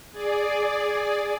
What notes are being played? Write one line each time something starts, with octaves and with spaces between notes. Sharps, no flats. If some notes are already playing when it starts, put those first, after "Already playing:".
G#4 D5